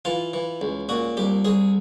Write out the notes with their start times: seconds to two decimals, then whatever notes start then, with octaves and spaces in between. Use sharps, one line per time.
0.05 E3 F4
0.34 E3
0.61 C#2
0.89 A#2 F#4
1.17 C2 G4
1.45 C2 G#4